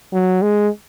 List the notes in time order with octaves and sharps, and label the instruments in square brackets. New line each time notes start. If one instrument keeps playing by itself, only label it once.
[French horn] F#3
G#3